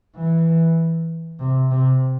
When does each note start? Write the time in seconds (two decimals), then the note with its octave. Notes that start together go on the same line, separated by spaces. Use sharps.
0.17 E3
1.40 C3
1.71 C3